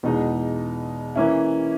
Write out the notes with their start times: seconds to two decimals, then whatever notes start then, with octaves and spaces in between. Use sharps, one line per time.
0.03 E2 B2 G#3 D#4
1.15 E3 A#3 C#4 E4